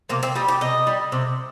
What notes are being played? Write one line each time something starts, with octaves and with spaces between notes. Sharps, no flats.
C3 A#3
C4
G3 D#4
G4
C3 D#5
G3
C3